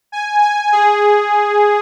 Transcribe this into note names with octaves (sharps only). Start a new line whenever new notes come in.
G#5
G#5
G#4